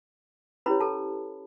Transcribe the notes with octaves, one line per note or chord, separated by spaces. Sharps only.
C#4 E4 G4 B4 C#5 B5
A4 A5